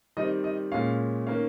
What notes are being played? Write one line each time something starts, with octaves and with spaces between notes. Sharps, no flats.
D#3 G3 C4 D#5
D#5
A#2 G#3 C#4 F5
D#3 A#3 C#4 F5